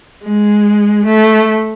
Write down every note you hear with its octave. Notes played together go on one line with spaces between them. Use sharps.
G#3
A3